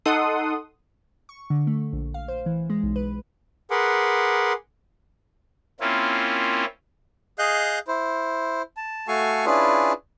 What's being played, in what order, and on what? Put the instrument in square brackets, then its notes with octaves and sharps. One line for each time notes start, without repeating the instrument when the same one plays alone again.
[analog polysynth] D#4 A4 F#5 C6 D#6
[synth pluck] C#6
D3
A3
A#1
F5
C5
E3
G#3
B1
B4
[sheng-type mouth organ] G#4 A#4 B4 F#5 C6 D6
[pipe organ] A#3 C4 C#4 E4 F4
[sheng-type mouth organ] G#4 D#5 F5 F#6 G6
E4 C5
A5
A3 F#4 A4 F5 G#5 C#6
C#4 D4 E4 F4 G#4 B4